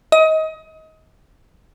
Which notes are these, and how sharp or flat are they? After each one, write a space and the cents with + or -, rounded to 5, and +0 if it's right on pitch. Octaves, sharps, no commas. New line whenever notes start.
D#5 +30